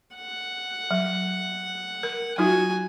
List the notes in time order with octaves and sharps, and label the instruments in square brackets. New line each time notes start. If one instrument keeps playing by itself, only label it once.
[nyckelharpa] F#5
[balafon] F#3
A#4
[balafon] F#3 D#4 F4 [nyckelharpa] F#4 G#5